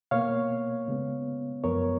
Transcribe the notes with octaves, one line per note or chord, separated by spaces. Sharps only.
B2 A#3 C#5 F5
C#3 G#3 B3
F#2 F3 B3 A#4 C#5